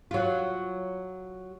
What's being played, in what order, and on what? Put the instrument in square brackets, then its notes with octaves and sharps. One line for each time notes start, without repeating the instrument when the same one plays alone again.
[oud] F#3 F4